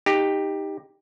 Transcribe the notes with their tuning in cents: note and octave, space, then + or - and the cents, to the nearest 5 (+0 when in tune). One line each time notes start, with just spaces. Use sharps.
D#4 +0 G4 +10